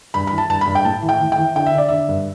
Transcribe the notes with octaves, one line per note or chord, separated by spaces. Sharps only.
G2 B5
E3 B5
A5
G2 A5
B5
G2
G5
A2 A5
E3
G5
E3
G5
E3
D3 G5
E5
D3 D5
D3 E5
G2